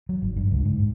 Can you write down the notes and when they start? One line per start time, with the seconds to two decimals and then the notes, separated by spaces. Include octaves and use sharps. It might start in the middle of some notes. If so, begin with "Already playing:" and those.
0.09 F#3
0.22 G#1
0.36 G2
0.51 C#2
0.65 G#2
0.79 G#2